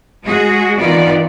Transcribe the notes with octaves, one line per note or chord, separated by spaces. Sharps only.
G#3 F#4 G#4
D#3 E3 B3 F4 D5